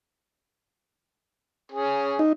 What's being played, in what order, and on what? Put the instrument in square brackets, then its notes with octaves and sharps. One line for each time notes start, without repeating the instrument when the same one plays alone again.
[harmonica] C#4 G#4
[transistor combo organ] D#4